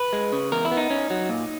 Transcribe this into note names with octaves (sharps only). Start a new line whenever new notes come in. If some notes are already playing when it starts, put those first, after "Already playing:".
Already playing: B4
G#3
C#3
E2 A#4
E4
B3
D#4
C#4
F#3
A#2